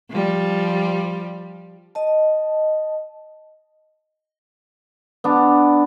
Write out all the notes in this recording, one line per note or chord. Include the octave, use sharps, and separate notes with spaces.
F3 G3
D#5 A5
B3 D4